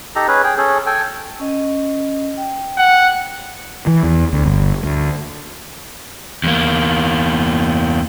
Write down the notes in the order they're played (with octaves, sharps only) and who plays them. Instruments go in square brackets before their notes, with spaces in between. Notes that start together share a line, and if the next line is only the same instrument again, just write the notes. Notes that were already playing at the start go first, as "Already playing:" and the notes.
[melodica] D#4 G4 A4 A#5
C#4 G#4 B4
G#4 G5
C#4 G#4 A4
A4 G5 G#5
[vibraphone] C#4 D#5
G5
[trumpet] F#5
[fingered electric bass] E3
E2
D2
G1
D2
[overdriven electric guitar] E2 A#3